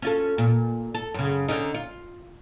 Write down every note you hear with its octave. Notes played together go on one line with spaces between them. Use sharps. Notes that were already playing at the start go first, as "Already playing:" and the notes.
C#4 F4 A4
A#2
A4
F#2 C#3
D3 C#4 D#4
F4